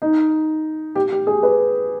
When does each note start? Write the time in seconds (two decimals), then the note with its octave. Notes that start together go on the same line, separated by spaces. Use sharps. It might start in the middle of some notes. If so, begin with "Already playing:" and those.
0.02 D#4
0.95 G4
1.12 G4
1.27 G#4
1.43 B4